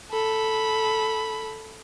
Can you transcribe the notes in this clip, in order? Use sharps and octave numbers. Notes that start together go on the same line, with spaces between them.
A4 B5